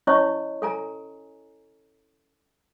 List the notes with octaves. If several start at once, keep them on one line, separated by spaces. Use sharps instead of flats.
C#4 E4 C#5 D#5 A5 C#6
A4 G#5 A#5